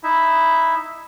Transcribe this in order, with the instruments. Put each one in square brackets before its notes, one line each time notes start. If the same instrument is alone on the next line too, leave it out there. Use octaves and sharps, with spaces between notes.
[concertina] D#4 E4 E5